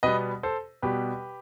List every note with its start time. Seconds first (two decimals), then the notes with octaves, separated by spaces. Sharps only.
0.03 B2 G3 B3 B4 D#5
0.43 A4 C5
0.82 B2 G3 B3 G4 B4